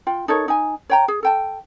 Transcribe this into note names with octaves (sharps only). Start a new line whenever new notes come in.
F4 G5
D#4 A4 A#4 C#5
D#4 G#5
C#5 G5 A#5
G#4
A4 G5 A5